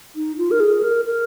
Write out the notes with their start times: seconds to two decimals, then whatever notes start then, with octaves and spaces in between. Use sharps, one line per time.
0.16 D#4
0.38 F4
0.51 A#4
0.60 G#4
0.83 A#4
1.05 A#4